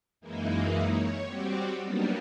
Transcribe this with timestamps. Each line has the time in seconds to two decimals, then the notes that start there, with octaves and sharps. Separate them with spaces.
0.21 F#2 E3 G#3 A#3 D#4 E4
0.84 C#5
1.24 G3 C4 F#4 G4
1.81 F#3 G3 A#3 B3 D4 D#4